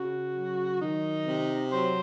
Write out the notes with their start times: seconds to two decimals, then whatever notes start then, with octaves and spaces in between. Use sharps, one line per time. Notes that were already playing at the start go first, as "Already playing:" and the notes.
Already playing: C#3 F#4
0.33 F#3
0.80 D#3 D#4
1.26 C3
1.72 F#3 C5